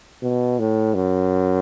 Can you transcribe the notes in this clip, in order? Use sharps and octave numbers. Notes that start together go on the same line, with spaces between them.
B2
A2
F#2